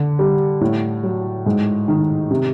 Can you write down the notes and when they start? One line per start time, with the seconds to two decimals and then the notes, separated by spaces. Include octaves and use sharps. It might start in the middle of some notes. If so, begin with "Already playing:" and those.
Already playing: D3
0.19 G3
0.61 A2
1.03 F#3
1.46 G#2
1.88 D#3
2.31 C3